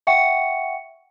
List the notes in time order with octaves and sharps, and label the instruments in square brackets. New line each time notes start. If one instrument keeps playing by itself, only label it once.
[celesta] E5 F#5 G5 C#6 C#7